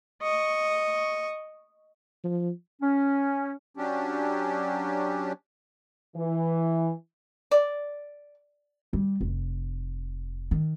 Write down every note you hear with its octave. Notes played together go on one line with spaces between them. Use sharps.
D#5 C#6
F3
C#4
F#3 C#4 D4 G4
E3
D5
G3
F1
D#3